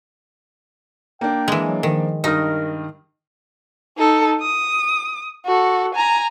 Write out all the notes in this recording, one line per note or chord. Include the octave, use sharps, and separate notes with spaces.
A#3 D4 G5
E3 G#3
F#3
D#3 F3
G2 D#3 D#4 A#4 D#6
D#4 A4
D#6
F#4 A4
G#5 A#5